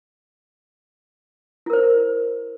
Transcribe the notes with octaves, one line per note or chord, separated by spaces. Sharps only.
E4 A#4 C5